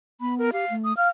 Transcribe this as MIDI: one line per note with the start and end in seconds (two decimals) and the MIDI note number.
0.21 0.50 59
0.21 0.35 83
0.38 0.51 70
0.53 0.65 67
0.53 0.74 77
0.70 0.95 57
0.85 0.96 87
0.97 1.09 77
0.97 1.09 89